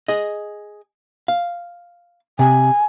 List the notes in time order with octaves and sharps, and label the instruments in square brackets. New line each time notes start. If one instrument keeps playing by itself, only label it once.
[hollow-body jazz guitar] G#4 D#5
F5
[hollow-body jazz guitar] C3 [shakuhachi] G#5